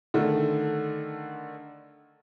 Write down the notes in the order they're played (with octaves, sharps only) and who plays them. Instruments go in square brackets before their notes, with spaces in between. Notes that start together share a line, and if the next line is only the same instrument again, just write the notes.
[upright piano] D3 D#3 A3